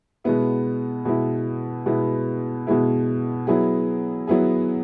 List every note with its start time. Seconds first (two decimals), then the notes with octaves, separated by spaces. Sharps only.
0.24 B2 G#3 B3 E4
1.05 B2 G#3 B3 E4
1.86 B2 G#3 B3 E4
2.67 B2 G#3 B3 E4
3.47 F#3 B3 E4 G#4
4.27 F#3 B3 E4 G#4